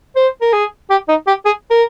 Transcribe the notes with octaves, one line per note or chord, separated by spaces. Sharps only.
C5
A#4
G#4
G4
D#4
G4
G#4
A#4